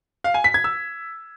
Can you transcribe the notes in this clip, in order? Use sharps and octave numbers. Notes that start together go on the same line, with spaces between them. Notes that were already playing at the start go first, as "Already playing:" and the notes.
F5
G#5
B6
G#6
E6